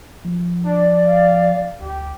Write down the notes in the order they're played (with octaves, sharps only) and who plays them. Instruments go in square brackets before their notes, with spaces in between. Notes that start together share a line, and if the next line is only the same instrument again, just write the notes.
[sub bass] F3
[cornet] D4 [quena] D5
[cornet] F5
[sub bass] D2 [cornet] G4